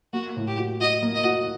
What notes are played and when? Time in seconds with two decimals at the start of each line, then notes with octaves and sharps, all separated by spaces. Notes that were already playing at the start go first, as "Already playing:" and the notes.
0.13 A#3 F#4
0.36 A2
0.48 G4
0.59 F#4
0.81 F#4 D#5
1.02 A#3
1.14 D#5
1.24 F#4